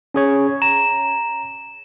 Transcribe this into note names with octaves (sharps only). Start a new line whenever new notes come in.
C#4 G#4 C#5
A#5 E7